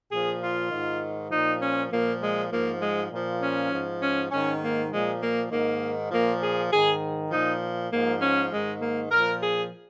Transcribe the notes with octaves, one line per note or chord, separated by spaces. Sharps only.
A#2 F3 G#4
F4
G#2 D#3
A#2 F3 D#4
C#4
A#2 F3 A#3
G#3
G#2 F3 A#3
G#3
A#2 F3
C#4
G#2 F3
C#4
G#2 D#3 C#4
A#3
A#2 F3 G#3
A#3
G#2 D#3 A#3
A#2 F3 A#3
G#4
G#2 D#3 G#4
A#2 F3 D#4
G#2 F3 A#3
C#4
G#2 D#3 G#3
A#3
A#2 F3 A#4
G#4